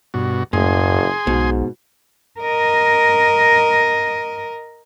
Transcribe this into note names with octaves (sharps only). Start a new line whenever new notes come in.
G2 B2 F#4
F#1 F#2 A2 G#4 G#5 C6
B1 G#2 B2
A#4 D#5